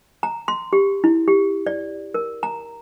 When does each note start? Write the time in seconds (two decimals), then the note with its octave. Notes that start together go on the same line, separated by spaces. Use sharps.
0.23 A#5
0.48 C6
0.73 G4
1.04 E4
1.28 G4
1.67 D5
2.14 A#4
2.43 A#5